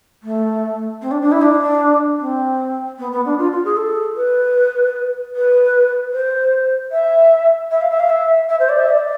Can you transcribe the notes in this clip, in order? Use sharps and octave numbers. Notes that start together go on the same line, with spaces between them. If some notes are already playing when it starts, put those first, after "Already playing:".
A3
C4
D4
D4
E4
D4
C4
B3
B3
D4
F4
F4
G#4
A4
B4
B4
C5
E5
E5
F5
E5
F5
E5
E5
C5
D5
E5
D5